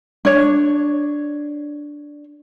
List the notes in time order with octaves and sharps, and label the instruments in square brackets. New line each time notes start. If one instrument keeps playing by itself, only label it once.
[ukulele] D4 C#5